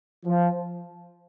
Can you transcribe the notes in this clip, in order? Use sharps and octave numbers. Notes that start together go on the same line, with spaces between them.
F3